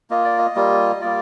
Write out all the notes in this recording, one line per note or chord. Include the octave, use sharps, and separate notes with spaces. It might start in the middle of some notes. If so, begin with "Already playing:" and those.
A#3 F4 D#5
D5
D#5
G3 A#3 F4
G3 A#3 F4 D5